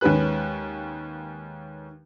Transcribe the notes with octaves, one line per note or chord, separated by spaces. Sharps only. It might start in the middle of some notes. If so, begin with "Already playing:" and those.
D#2 G#3 C#4 B4 F#6